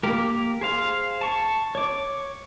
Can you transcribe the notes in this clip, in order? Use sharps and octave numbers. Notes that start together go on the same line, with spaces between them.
A#3 G4 A#4
G#4 C5 F5
A5 C#6
C#5 D6